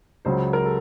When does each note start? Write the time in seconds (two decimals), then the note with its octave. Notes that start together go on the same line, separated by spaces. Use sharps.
0.25 C#2 C#3 F#3 C5
0.53 A#4
0.65 A4